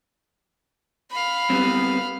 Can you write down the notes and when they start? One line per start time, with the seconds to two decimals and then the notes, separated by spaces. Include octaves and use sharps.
1.11 F5 B5
1.50 G3 B3 C4